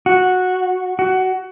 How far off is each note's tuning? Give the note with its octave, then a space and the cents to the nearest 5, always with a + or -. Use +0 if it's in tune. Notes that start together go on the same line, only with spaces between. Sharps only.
F#4 -10
F#4 +15